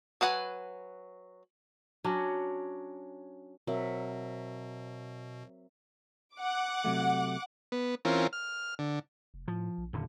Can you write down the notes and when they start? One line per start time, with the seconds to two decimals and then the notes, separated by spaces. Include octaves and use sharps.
0.21 F#3 B4 F#5 G#5
2.04 F#3 C#4 D4
3.67 B2 F#3 C4 A#4 E5
6.36 F#5 D6
6.84 C3 F#3 A3
7.72 B3
8.05 E3 C4 C#4 F4 A#4
8.33 F6
8.79 D3
9.34 F1
9.48 A2 F3
9.78 A#1
9.93 D#1 F2 D3